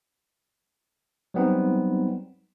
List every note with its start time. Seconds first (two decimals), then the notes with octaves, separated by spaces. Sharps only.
1.34 F#3 G3 B3 C4 D#4